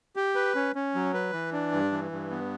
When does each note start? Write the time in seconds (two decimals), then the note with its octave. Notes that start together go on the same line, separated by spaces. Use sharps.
0.16 G4
0.35 B4
0.55 C#4
0.75 C#4
0.95 F#3
1.14 B4
1.33 E3
1.53 D4
1.72 G2
1.92 E3
2.11 G2
2.31 B3